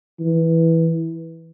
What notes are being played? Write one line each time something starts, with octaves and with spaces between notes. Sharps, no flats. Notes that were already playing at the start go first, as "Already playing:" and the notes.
E3